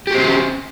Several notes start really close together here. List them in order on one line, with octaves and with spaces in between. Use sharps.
G4 F#4 C5 C#4